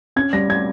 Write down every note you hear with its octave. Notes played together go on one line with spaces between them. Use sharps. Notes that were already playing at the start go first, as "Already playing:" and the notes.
C#4 G#6
G3 A#6
G3 G#6